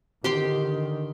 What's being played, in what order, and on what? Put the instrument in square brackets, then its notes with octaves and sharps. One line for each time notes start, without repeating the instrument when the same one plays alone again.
[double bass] D3 D#3 [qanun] G4 G5 C6